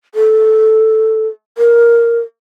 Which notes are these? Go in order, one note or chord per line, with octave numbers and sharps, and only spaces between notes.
A4
A#4